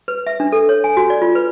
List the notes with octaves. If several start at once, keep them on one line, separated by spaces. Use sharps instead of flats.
B4
E5
D4
A4
C#5
G#5
F#4
D5
F4
B4